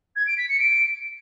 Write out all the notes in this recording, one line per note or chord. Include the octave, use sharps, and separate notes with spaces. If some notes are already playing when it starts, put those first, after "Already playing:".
G#6
D7
B6
C#7
D7